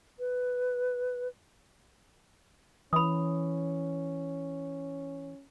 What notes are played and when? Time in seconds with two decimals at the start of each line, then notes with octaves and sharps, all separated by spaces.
0.19 B4
2.93 E3 C#4 B5 D#6